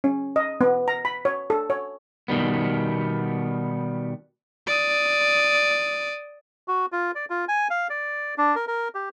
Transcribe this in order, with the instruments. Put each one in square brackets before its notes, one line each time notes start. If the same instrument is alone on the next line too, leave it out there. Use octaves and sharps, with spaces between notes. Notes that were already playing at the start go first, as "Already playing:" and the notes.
[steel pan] C#4
D#5
B3
A#5
B5
C#5
A4
C#5
[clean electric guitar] B2 D#3 G3 B3
[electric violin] D5 D#6
[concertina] F#4
F4
D5
F4
G#5
F5
D5
D4
A#4
A#4
G4